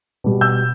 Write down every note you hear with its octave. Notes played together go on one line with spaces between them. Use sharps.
B2 G3
E6 G6